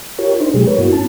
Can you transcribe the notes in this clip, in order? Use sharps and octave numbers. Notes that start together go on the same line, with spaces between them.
F4 G4 A#4 C#5
D4 D#4 C5
B2 F#3 G#3 A3 G4 G#4
A#4 B4 C#5
G2 B3 E4 F#4
C#4 A5